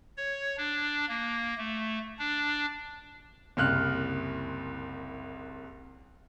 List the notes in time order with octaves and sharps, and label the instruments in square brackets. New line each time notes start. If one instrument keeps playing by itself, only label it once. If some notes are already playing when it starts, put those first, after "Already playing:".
[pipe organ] C#5
D4
A#3
A3
D4
[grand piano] F#1 C2 F6 F#6